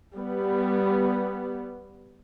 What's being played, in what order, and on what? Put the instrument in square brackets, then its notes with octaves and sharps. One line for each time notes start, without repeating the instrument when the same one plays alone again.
[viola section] G3 B3